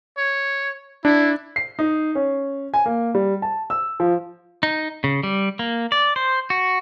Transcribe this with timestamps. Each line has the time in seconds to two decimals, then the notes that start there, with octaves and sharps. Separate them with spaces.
0.18 C#5
1.05 D4 E4
1.56 C7
1.79 D#4
2.15 C#4
2.74 G#5
2.86 A#3
3.15 G3
3.42 A5
3.70 E6
4.00 F3
4.63 D#4
5.04 C#3
5.23 G3
5.59 A#3
5.92 D5
6.16 C5
6.50 F#4